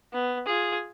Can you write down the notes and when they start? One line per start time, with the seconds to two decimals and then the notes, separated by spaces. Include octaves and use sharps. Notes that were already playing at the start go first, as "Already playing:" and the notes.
0.13 B3
0.46 F4 G#4